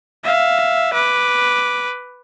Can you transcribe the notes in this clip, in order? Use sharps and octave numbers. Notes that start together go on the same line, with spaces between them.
E5 F5
B4 D6